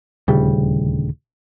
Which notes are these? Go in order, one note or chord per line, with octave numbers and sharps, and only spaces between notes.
D#1 D2 C#3 G3